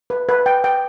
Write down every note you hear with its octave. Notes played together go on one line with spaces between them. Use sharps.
B4
B4
G5
G5